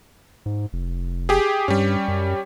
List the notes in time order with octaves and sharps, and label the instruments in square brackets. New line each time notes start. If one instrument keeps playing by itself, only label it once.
[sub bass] G#2
F1
[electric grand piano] G4 G#4
[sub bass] G2 [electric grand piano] G3 C#4
[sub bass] F#2